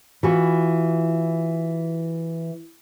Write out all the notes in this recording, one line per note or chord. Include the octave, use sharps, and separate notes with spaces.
E3 F4 F#4